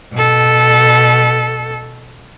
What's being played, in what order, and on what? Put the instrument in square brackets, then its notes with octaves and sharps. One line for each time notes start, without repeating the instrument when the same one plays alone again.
[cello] B2 A4